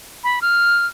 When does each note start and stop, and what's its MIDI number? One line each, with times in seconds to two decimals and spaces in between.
0.24 0.39 83
0.42 0.86 89